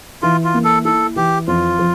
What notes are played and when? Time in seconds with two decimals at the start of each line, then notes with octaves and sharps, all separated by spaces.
0.22 E3 F4
0.44 F4
0.54 A#3
0.64 A4
0.85 E4 A4
1.16 E3 G4
1.47 F2 F4
1.79 F3